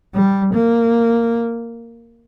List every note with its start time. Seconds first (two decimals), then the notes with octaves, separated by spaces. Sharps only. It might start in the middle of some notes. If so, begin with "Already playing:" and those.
0.14 G3
0.54 A#3